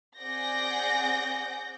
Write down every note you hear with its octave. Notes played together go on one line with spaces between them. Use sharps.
C4 G#4 D5 F#5 G6 A#6